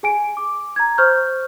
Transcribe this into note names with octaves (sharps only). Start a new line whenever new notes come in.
G#4 G#5 D7
D6
A#5 G#6
C5 C#6 F6 G6